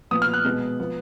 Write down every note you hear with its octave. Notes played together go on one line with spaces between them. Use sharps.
A#2 F3 B3 D#6
F6
F#6
B2 G#3 B3
F3 B3